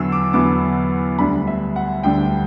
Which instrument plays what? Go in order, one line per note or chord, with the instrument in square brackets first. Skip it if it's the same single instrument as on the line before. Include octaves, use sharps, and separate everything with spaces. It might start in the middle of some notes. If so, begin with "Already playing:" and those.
Already playing: [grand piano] E2 D3 F#3 B3 E6
D6
E2 D3 F#3 B3 D6
D2 D3 G3 D4 B5
E5
F#5
D2 D3 G3 D4 G5